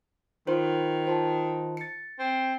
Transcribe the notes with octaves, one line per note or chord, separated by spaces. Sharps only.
D#3 F4 C5
F4 C5 A5
A6 C#7
C4